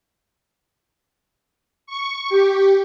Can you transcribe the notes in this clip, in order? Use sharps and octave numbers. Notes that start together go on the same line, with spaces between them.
C#6
G4